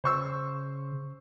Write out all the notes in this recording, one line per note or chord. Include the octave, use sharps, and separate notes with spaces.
C#3 C5 C#6 E6